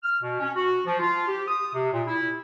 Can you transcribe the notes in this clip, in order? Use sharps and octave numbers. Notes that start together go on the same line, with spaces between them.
F6
B2
C#4
F#4
F3
F4
G4
D#6
C3
A#2
E4